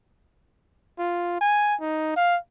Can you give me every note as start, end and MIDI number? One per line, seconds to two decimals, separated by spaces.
0.99 1.36 65
1.41 1.75 80
1.81 2.14 63
2.16 2.37 77